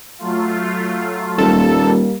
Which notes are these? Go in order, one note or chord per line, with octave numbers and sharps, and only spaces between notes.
F#3 A3 F4
D#1 G3 A#3 A4